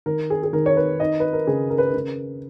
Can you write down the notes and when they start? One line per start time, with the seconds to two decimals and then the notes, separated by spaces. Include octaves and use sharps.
0.06 D#3 A#4
0.30 G#4
0.43 G#4
0.53 D#3 A#4
0.66 C#5
0.77 B4
1.00 D#4 D#5
1.20 B4
1.33 A#4
1.47 C#3 G#4
1.70 A#4
1.78 B4
1.87 A#4
1.94 C#3